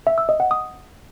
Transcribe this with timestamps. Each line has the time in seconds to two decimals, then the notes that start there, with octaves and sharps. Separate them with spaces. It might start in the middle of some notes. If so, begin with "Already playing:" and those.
0.07 E5
0.18 E6
0.29 D#5
0.40 F#5
0.51 D#6